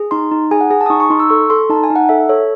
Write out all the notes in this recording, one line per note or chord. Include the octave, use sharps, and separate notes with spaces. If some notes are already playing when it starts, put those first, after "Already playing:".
Already playing: G#4
D#4 C6
D#4
G#4 G#5
F#5
G#4 G#5
A5
D#6
D#4 C#6
C#6
D#4 C6
E6
A4 C#6
A4 C6
D#4 A5
G#5
D#4
F#5
A4 E5
A4 C#5